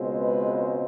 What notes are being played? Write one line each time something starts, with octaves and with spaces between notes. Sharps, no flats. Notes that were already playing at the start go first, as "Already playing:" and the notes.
Already playing: C#2 B2 G#3 C4
B4